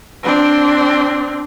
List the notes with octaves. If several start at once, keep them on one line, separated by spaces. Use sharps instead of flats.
C4 D4